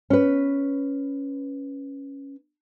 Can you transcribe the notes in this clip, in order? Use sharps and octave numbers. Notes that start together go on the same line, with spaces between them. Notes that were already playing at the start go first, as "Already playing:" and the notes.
C#4 B4